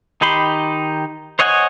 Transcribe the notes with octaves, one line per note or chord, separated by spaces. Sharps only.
D#3 D#4 G4 B5 C6
C5 C#5 D#5 F#5 G#5